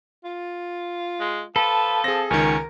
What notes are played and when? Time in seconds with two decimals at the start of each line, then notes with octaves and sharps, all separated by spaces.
0.25 F4
1.20 G#3
1.56 F3 A4 B4
2.04 C4 G#4 A#6
2.31 C#2 D#3 C#4 A#4